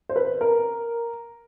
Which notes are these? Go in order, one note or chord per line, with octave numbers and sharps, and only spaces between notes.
C5
B4
A#4